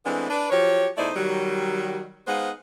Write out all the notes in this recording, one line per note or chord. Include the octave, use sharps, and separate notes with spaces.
E3 G#3 A3 B3 C4 D4
D4 B4
F3 F#3 G4 C#5
E2 A3 D#4 E4 C5 D5
D#3 F#3 G3
G#3 B3 D#4 C5 F5 F#5